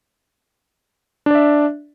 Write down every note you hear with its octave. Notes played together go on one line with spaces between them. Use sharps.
D4 D5 E5